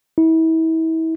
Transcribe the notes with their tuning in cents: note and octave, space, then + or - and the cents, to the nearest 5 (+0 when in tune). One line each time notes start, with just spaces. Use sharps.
E4 -35